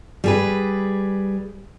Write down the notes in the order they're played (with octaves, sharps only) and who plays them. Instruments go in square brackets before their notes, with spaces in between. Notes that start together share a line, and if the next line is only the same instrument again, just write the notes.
[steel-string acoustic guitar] G3 G#4 B4